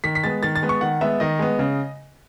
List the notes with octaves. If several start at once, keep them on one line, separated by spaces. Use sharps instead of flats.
D#3 B6
B6
G#3 B3 A6
D#3 A6
A6
G#3 B3
C#6
D#3 F#5
G#3 B3 E5
D#3 D#5
G#3 B3
C#3